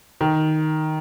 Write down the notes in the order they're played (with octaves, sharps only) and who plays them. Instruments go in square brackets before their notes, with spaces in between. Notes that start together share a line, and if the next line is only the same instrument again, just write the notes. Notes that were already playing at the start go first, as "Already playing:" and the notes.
[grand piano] D#3